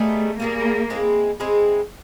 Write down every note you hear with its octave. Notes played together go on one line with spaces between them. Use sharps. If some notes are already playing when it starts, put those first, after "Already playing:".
Already playing: G3 A3 B3 D#4 G#4
G3 A#3 B3 D#4 G#4
G#3 C4 E4 G#4
G#3 C4 E4 G#4